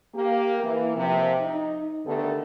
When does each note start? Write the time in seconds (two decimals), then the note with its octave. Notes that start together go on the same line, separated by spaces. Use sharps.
0.15 A#3 G4
0.63 E3 A#3
0.96 C3 F3
1.40 D#4
2.06 D3 D#3 A3 B3 G4 A4